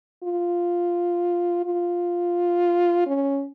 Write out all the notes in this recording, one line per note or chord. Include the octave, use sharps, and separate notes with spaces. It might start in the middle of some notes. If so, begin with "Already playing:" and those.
F4
F4
C#4